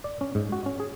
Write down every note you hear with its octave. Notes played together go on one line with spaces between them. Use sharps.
D5
C#4
G#2
F#4
C#4
G#4